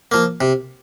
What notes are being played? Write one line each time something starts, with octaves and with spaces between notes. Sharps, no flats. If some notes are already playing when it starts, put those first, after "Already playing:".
F3 A#3
C3